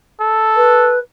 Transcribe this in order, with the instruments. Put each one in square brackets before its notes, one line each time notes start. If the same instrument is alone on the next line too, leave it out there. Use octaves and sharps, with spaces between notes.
[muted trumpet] A4
[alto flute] B4